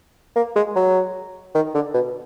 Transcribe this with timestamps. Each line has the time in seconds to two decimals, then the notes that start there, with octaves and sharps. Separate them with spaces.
0.36 A#3
0.56 G#3
0.76 F#3
1.54 D#3
1.74 D3
1.94 B2